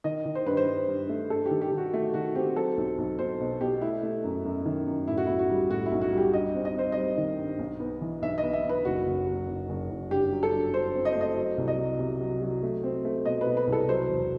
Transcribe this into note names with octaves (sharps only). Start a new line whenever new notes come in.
D#3 D#5
D#3
C5
G2 B4
C5
G2
G2
A3
G2 A4
G4
D#3
G4
D#3
F#4
A3
D#3 F#4
C4 G4
F#3 A4
B1
B1
B1 C5
B2
B2 G4
A3 E4
A3
F#2
F#2
D#3
F#2
A2 E4
F#4
B1 E4
F#4
G3
A2 F#4
E4
B1
F#4
G3
G4
G2 D#5
C4
D#5
C4 C5
G3 D#5
D#3
G2
B1
B3
E3
B1 E5
D#5
B3
E5
B1
B4
F#1 F#4
F#1
F#3
F#1
F#1
F#1
G2 G4
F#3
A4
G2
G2 C5
C4
D#5
C5
A3
D#5
F#3
C2
D#5
F#3
C3
F#3
F#3
A3
C4
A3
B2 D#5
B4
B2
B4
C2
A4
F#3 C5
E1